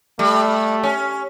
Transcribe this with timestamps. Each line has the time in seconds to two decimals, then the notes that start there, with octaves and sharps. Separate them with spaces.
0.19 G3 A3
0.83 C#4